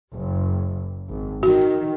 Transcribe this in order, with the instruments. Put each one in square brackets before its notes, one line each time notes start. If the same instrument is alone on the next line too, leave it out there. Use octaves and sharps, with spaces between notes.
[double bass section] F#1
G#1
[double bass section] D#3 [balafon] F#4